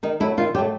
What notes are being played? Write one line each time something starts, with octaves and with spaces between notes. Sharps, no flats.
D#3 D#4
F#3 A3 E4
D#3 F4
F#3 A3 G4